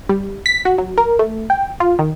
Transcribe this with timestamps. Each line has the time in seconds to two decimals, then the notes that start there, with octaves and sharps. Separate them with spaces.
0.09 G3
0.46 B6
0.65 F#4
0.78 F#3
0.98 A#4
1.19 A3
1.50 G5
1.80 F4
1.99 D#3